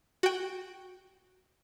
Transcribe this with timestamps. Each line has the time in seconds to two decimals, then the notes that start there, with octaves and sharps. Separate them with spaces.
0.23 F#4 G5